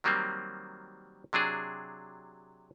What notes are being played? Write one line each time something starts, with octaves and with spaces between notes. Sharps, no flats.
D#3 F#3 G3 A#3 C4
C3 F#3 D4 G#4